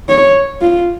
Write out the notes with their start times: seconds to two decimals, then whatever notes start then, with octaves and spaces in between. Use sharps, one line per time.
0.09 C#5
0.61 F4